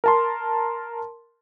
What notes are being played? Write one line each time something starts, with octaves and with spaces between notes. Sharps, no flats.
A#4 A5 C6